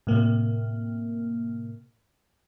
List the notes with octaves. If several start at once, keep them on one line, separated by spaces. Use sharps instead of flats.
A2 C3 A#3